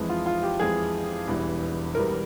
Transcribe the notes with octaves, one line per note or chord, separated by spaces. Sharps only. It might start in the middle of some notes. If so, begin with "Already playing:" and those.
Already playing: F2 E3 G#3
F4
F4
G4
F2 E3 G#3 G#4
E1 E2 E3 G3
E1 E2 E3 G3 A#4